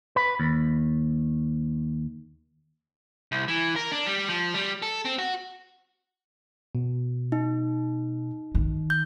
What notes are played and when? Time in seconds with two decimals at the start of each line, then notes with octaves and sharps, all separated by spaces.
0.16 B4
0.40 D#2
3.32 C2
3.48 E3
3.76 A#4
3.92 D4
4.07 G3
4.28 F3
4.54 G3
4.82 A4
5.05 C4
5.19 F#4
6.75 B2
7.32 D#4
8.55 D#3
8.90 G6